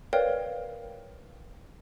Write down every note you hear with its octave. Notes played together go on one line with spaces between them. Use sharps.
A#4 B4 C#5 D5 F5 G5